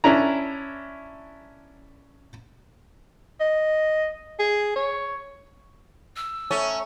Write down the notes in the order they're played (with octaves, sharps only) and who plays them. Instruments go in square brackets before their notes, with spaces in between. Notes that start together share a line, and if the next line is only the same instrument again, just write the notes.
[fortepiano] C#4 D4 E4 A#5
[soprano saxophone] D#5
G#4
C#5
[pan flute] E6
[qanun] A3 E5 A#5 [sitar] C#4